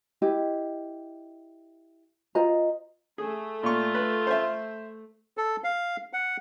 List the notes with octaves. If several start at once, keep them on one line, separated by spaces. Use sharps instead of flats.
E4 G4 D#5
F4 C5 D#5 A#5
A3 G#4
A#2 F4 C#6
B4
C5 E5
A4
F5
F#5